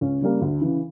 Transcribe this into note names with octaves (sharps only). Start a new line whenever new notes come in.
C#2 C#4
C#3 G3 A#3
D2
C#3 E3